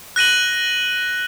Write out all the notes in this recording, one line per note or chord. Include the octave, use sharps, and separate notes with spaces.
F#6 A#6 D#7 F#7